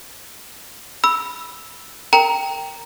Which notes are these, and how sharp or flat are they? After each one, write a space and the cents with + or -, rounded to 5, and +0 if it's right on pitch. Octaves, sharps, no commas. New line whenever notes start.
B5 +0 E6 +0
A#4 -20 G5 +0 A#5 +0